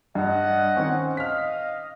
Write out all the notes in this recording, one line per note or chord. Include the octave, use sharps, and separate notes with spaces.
G2 D#5 F#5
D#3 C4 C#4
D#5 F5 F6 B6